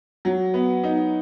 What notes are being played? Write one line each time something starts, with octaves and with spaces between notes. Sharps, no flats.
F#3
B3
D#4